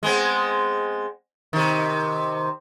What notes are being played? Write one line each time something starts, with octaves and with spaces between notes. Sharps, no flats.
G#3 B3 C4
C3 D#3